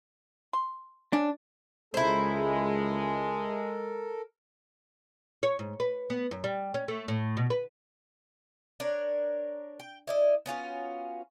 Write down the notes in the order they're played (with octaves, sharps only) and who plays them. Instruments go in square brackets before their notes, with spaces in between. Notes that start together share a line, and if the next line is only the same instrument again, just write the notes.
[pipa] C6
[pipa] C#4 [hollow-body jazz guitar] D4
[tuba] C#2 [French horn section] G#3 [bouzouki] E4 C5 [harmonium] A4 A#4
[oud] C#5
G#2
B4
B3
F#2
G3
C#4
A3
A2
B2
B4
[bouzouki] D4 A#4 C#5
G5
E4 D5 D#5
B3 C#4 F4 F#4